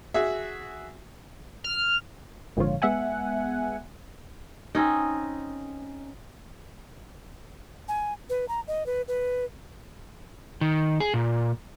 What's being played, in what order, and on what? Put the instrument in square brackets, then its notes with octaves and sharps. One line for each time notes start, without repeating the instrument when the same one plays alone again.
[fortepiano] F#4 G#4 E5
[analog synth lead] F6
[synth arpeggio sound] G#1 A#2 D3 F3 F4 C#5
G#3 B3 E5 F#5 G#5
[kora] C4 C#4 D#4
[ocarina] G#5
B4
A#5
D#5
B4
B4
[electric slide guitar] D#3
G#4
A#2